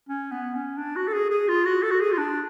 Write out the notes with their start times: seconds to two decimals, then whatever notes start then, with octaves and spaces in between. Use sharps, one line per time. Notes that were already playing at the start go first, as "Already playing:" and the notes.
0.09 C#4
0.31 B3
0.55 C#4
0.78 D4
0.96 F#4
1.08 A4
1.13 G#4
1.30 G#4
1.48 F4
1.65 F#4
1.83 A4
1.91 F#4
2.01 G#4
2.12 F4
2.18 D4